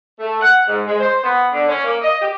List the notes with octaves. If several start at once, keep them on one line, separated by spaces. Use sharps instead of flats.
A3
F#5
G#2
G#3
C5
B3
D3
C#4
A#3
D#5
G4